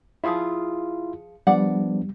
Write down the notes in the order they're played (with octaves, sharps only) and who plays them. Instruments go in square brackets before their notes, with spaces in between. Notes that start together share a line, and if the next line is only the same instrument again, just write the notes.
[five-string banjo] F3 G#4 E5 [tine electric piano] E4 F4
[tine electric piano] F3 B3 D4 [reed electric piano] G3 [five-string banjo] D5 F#5